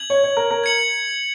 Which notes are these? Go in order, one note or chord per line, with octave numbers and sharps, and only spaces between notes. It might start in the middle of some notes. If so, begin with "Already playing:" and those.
Already playing: G#6 F#7
C#5
C#5
A#4
A#4
G#6 C#7 F#7